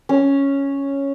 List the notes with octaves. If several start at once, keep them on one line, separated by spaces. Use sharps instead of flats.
C#4